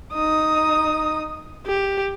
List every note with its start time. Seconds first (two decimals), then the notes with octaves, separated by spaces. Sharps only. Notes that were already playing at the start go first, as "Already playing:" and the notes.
0.13 D#4 D#6
1.66 G4